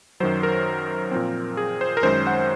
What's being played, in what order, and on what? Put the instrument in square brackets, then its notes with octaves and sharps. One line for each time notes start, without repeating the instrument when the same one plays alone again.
[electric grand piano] F#2 D#3 F#3 C5
A#4
A#2 F3 C4
G#4
C5
A#4
F#2 D#3 G#3 C#4 C5
F#5